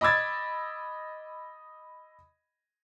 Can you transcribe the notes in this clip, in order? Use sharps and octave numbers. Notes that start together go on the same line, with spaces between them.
D#5 B5 D6 E6 G#6 A6